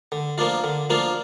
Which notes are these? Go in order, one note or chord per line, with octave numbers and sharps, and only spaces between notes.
D3
F3 A#3 D4 F4
D3
F3 A#3 D4 F4